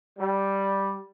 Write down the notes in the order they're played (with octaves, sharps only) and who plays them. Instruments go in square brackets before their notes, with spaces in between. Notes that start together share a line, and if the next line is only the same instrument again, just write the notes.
[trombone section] G3